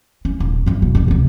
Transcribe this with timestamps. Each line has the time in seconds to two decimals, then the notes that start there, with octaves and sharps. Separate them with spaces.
0.25 C#4
0.40 D#1
0.66 G1 F#2
0.82 B2
0.95 F2 A2
1.08 D2 C3